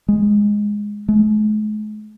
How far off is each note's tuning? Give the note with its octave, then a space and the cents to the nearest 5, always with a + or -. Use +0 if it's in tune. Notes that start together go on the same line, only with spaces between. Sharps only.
G#3 -5
G#3 +45